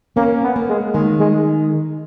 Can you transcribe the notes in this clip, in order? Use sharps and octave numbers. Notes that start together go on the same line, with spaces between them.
A#3 C#4
B3
A#3
G#3
D#3 G#3
G#3